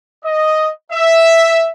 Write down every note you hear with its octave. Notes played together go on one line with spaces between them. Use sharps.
D#5
E5